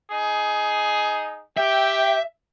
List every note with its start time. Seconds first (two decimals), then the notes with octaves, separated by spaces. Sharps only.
0.12 D#4 G#4
1.57 G4 E5 G5